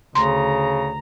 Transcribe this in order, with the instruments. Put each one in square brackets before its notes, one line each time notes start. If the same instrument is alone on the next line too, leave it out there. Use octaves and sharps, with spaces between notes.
[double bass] D2 [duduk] C#3 [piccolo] A#5 [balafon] C6